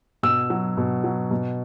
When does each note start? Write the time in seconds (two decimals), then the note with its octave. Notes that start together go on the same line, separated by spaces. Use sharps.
0.23 B2 E6
0.50 F#3
0.77 B2
1.04 F#3
1.31 B2